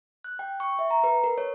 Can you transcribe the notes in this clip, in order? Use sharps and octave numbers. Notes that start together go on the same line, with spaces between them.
F#6
G5
C#6
E5
A#5
B4
A#4
C#5